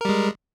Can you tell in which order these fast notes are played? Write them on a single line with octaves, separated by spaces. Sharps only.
A#4 G3 G#3